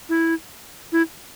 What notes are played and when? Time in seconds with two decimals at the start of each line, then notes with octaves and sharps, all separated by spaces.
0.09 E4
0.92 E4